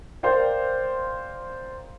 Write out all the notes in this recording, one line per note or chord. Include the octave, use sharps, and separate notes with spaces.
A#4 C5 D5 F5 G5